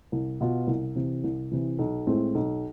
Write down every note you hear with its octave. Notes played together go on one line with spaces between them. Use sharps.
C2
B2 B3 F4
C2
C3 E3
C2
C3 E3
B1
A2 G#3 C4
B1